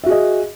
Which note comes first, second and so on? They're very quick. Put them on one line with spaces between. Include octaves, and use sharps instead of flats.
E5 F#4 G#4 D#5